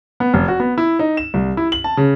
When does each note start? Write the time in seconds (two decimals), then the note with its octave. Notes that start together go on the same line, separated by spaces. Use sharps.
0.20 B3
0.34 F1
0.48 F#4
0.60 B3
0.78 E4
0.99 D#4
1.17 E7
1.34 C2
1.57 E4
1.72 F#7
1.84 A5
1.97 C#3